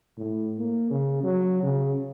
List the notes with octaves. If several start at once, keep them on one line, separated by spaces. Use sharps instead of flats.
A2
A#3
C#3
F#3
C#3